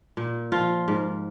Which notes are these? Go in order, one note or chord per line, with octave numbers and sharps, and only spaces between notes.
A#2
F3 F4
G#2